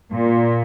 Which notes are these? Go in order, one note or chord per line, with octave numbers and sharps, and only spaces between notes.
A#2